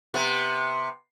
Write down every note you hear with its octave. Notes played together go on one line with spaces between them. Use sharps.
C3 B3